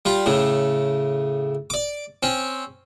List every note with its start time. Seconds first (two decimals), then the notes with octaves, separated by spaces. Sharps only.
0.05 G3 F4
0.26 A2 C#3
1.70 D5 D6
2.23 C4 C#4